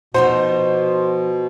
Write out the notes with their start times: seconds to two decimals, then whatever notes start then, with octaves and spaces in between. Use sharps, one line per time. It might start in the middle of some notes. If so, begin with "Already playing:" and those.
0.14 B2 F3 D#4 F#4 C5